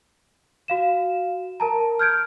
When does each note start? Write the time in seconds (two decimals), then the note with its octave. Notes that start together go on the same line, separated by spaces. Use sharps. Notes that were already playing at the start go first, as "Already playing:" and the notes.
0.68 F#4 F5 E7
1.60 A#4 A5 A#5
1.99 F6 G6 G#6 D7